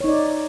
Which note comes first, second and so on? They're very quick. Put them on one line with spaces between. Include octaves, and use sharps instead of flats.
C#5 D#4 D5